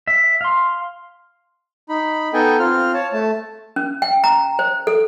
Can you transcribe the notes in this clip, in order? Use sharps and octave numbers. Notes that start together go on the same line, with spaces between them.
E5
F5 C6
D#4 B5
B3 D#4 A4 D#5 G5 G#5
C4 F4 F6
C#5 A5
A3 A5
C#4
G5
A#5
C5
A4